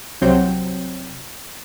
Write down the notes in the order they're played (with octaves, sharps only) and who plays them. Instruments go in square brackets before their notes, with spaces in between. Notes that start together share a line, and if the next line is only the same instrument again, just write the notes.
[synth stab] C2 C3 F#3 C4 G6